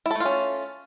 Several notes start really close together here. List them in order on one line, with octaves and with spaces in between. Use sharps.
E4 A4 A3 F4 C#4